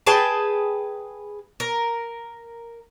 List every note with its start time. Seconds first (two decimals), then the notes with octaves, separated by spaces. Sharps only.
0.07 G#4 B4 G5 A5
1.60 A#4